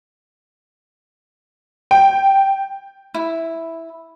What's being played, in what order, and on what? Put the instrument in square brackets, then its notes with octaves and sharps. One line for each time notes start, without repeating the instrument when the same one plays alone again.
[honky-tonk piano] G5
[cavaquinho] E4